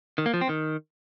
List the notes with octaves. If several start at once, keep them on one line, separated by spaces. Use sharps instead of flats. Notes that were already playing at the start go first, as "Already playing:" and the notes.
D#3
A#3
F3
C4
D#3